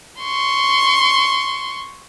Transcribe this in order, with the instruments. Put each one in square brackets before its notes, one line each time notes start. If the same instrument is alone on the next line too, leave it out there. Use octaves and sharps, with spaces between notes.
[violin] C6 C#6